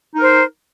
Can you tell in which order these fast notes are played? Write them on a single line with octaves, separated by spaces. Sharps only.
D#4 A#4 C5